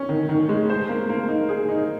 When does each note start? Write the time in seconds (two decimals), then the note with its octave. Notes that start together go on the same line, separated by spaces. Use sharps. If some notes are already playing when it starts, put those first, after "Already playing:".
Already playing: C#4
0.09 D#3
0.29 D#3
0.49 G#3
0.70 C5
0.89 A#3
1.09 A#3
1.28 D#4
1.49 G#4
1.69 D#4